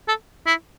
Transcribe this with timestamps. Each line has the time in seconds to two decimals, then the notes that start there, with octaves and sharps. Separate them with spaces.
0.08 A4
0.47 E4